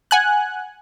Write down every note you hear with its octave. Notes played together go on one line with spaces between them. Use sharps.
F#5 G#5 F#6